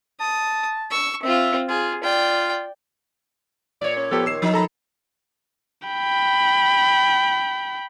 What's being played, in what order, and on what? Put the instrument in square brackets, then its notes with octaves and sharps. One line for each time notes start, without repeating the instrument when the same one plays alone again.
[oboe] A5 [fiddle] D#6
[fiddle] C#6 E6
[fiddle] C4 F4 [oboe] E5
[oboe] F4 [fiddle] G#4
[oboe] F4 [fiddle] D5 G5
[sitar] A#2 C#5 [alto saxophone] D5
[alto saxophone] C#4
[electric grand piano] F3 B3 G4 [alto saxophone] A4
[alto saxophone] D#3 [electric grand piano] E6 C7 E7
[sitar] F3 D#4
[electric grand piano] A4 A#5 B5
[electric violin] G5 B5